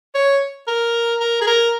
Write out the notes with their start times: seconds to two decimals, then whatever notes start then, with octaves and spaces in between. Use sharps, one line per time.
0.15 C#5
0.67 A#4
1.20 A#4
1.41 G#4
1.47 A#4